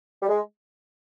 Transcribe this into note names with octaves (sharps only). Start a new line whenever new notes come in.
G3
G#3